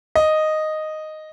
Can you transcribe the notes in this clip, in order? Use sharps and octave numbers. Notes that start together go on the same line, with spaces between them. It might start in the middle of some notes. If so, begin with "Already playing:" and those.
D#5